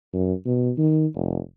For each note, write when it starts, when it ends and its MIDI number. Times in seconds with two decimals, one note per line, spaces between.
0.14 0.33 42
0.46 0.71 47
0.78 1.06 51
1.14 1.39 29